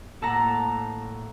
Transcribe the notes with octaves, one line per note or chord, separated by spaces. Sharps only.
A2 A#3 A4 F#5 A5 A#5